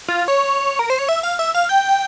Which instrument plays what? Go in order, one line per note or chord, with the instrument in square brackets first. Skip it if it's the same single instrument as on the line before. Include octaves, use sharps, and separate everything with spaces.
[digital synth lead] F4
C#5
A#4
C5
C#5
E5
F5
E5
F5
G5